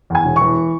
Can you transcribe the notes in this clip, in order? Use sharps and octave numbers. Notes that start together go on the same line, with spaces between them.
E2 G#5
E1
E3 C#6